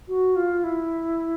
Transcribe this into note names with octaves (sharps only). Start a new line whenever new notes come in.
F#4
F4
E4